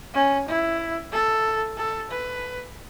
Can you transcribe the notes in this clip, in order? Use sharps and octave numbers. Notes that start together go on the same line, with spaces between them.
C#4
E4
A4
A4
B4